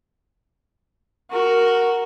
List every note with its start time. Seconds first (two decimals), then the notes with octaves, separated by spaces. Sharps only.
1.31 F#4 A#4